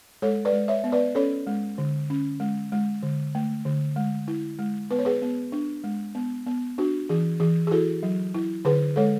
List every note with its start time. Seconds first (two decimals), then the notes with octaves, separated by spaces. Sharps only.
0.22 G#3 A4 C#5
0.45 B4 D5
0.53 G#3
0.68 C#5 E5
0.84 B3
0.92 B4 D5
1.15 C#4 A4 C#5
1.47 G#3
1.78 D3
2.10 C#4
2.40 G#3
2.72 G#3
3.03 D3
3.35 A3
3.66 D3
3.96 G#3
4.28 E4
4.59 G#3
4.91 B3 B4
4.99 C#5
5.05 G#4 B4
5.22 B3
5.52 D4
5.84 G#3
6.15 B3
6.46 B3
6.78 D4 F#4
7.09 E3 G#4
7.40 E3 G#4
7.67 G#4
7.71 E4 F#4 A4
8.03 F#3
8.35 E4
8.65 D3 G#4 B4
8.96 G#3 A4 C#5